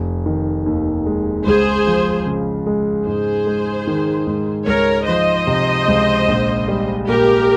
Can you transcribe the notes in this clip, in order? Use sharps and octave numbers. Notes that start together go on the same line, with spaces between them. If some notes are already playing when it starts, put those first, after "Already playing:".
Already playing: F1
D#3
D#2
G#3
C#2 G#4 C5
F3
C#3
G#3
G#2 G#4 C5
G#3
D#3
G#2
C#2 A#4 C#5
F3 C5 D#5
C3
C#2
A#1
G3
A#2 G4 A#4